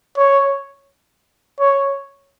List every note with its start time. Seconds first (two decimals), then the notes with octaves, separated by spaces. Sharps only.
0.17 C#5
1.60 C#5